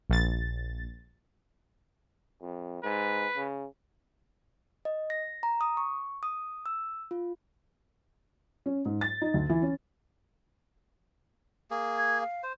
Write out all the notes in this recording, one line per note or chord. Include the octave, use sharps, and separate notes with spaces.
A#1 A6
F2
G#2 B4
C#3
D#5
A#6
A#5
D#6
C#6
D#6
E6
F4
C#4
G#2
A6
D#4
D2
E3
C#4
A#3 G#4
G#6
F5
C5